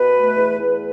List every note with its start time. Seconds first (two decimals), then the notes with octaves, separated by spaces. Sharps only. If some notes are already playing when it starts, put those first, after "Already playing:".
Already playing: B2 B4
0.15 A3
0.37 E2
0.60 E2